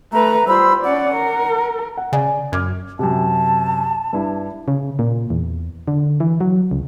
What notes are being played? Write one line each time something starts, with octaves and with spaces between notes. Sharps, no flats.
A3 B4 A#5
G3 F4 C5 B5 E6
C#4 D5 F#5
A#4
F#5
C#3 D5 G#5
F#2 D6 F6 G#6
F#2 C3 A5
G2 D4 E4
C#3
A#2
E2
D3
E3
F#3
C#2